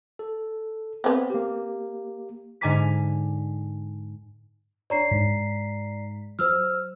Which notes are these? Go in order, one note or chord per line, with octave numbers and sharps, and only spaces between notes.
A4
B3 C4 B4
A#3 G4
G#2 D3 G#5 A#5 D6 B6
D4 C#5 D5 A#5 C7
G#2 B6
F#3 C5 E6 F6